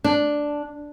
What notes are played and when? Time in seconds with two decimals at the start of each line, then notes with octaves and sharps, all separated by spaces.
0.04 D4